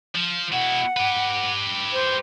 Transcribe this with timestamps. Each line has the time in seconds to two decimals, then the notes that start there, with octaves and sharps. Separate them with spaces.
0.15 F3
0.52 B2 E4 F#5
0.96 G4 B4
1.93 C5